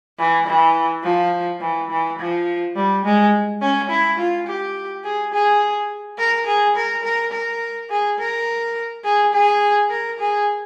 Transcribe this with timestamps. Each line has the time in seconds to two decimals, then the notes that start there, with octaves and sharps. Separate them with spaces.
0.19 E3
0.47 E3
1.04 F3
1.61 E3
1.90 E3
2.18 F3
2.76 G3
3.04 G#3
3.61 C#4
3.90 E4
4.18 F4
4.47 G4
5.04 G#4
5.33 G#4
6.18 A#4
6.47 G#4
6.76 A#4
7.04 A#4
7.32 A#4
7.90 G#4
8.19 A#4
9.04 G#4
9.33 G#4
9.89 A#4
10.19 G#4